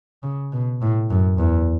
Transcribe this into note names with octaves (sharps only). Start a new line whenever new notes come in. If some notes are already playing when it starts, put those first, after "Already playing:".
C#3
B2
A2
F#2
E2